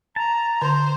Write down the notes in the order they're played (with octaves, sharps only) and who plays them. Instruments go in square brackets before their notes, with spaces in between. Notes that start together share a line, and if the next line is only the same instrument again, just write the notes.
[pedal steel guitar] A5 [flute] A#5
[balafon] D3 [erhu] C5